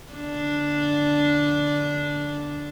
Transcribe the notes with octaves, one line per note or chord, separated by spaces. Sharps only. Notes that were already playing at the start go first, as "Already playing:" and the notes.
D3 D4